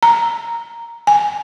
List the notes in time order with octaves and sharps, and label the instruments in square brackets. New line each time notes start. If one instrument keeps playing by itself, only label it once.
[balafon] A#5
G#5